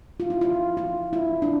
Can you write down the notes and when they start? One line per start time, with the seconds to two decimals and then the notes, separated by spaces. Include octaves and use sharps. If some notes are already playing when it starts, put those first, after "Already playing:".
0.20 F4
0.30 E4
0.41 F4
0.77 F4
1.13 E4
1.42 D4